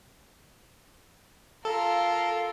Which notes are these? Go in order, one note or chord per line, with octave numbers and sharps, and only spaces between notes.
F4 A4 A#4